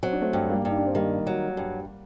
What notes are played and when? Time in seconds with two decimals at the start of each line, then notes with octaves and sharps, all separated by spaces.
0.03 F#3 C4
0.13 D4
0.21 A3 C4
0.33 G2
0.50 G3 A#3
0.65 G2 D#4
0.77 D4
0.87 C4
0.95 D#3 G3 A#3
1.27 F#3
1.57 G2